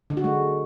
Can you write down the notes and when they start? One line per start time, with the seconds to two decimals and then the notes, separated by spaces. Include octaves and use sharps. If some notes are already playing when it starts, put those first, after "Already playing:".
0.10 D3
0.17 F#4
0.24 G#3